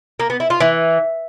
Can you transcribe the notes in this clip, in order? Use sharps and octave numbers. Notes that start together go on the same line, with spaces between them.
A#3
B3
E4
F4
E3